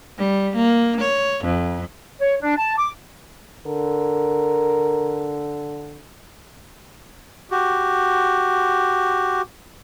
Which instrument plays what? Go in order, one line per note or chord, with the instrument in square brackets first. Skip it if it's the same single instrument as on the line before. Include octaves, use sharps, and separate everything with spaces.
[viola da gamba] G3
A#3
C#5
F2
[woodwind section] C#5
D4
A5
D6
[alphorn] D3 [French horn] A#4
[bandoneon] F#4 G4